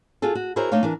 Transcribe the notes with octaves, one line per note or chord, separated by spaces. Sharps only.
F4 F#4 G#4 A4
F#4
E4 F#4 G#4 A#4 C5 C#5
A3 D4 D#4 C#5 F5
E3 D4 A#4